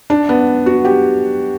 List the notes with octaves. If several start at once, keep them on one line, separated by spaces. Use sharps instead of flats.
D4
B3
F#4
G4